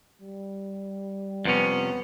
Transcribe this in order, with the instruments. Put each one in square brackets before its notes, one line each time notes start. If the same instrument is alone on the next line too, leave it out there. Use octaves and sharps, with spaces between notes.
[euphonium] G3
[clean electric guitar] F2 C3 C#4 [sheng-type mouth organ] B3